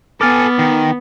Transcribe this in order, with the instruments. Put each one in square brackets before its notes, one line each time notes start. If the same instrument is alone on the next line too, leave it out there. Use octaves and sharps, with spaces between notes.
[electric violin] B3 [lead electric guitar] A4 G#5 [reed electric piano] D6 F6 A6
[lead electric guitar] D#3